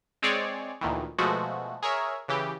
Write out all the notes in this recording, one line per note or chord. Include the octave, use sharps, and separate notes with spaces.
G#3 C4 G#4 C#5 D5
D2 A#2 D#3 E3
B2 F3 G#3 A3 F#4
G#4 A#4 C#5 E5
C#3 E3 G4